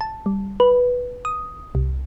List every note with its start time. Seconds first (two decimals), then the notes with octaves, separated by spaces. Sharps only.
0.01 A5
0.26 G3
0.60 B4
1.25 D#6
1.75 C2